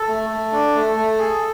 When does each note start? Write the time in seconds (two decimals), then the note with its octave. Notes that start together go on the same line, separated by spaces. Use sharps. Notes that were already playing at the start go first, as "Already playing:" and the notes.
Already playing: A4
0.08 A3
0.30 A3
0.52 D4
0.75 A3
0.96 A3
1.19 G#4